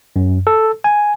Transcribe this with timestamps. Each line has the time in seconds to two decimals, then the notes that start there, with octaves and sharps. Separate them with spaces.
0.16 F#2
0.47 A4
0.84 G#5